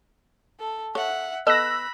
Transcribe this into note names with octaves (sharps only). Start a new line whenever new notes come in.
A4
A4 C#5 E5 F#5
B3 A4 D#5 B5 E6 F#6 A#6